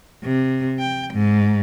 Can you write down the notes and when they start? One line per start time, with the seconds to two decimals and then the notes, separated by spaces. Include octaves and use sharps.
0.23 C3
0.79 G5
1.12 G#2